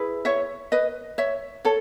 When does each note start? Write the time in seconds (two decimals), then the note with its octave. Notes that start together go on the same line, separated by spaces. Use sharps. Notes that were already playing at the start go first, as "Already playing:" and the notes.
Already playing: E4 G#4 B4
0.25 C#5 E5
0.72 B4 D#5
1.18 C#5 E5
1.65 A4 C#5